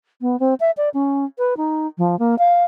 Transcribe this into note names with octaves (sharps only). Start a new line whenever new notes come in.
B3
C4
E5
D5
C#4
B4
D#4
F3
A#3
F5